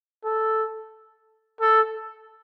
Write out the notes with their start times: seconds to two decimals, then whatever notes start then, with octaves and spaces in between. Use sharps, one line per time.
0.24 A4
1.60 A4